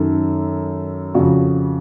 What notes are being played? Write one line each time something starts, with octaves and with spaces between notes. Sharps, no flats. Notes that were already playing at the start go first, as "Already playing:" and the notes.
Already playing: F#2 D#3 A4
F2 C#3 F#4